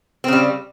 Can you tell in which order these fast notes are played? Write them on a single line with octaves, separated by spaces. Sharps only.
C4 C#3 G3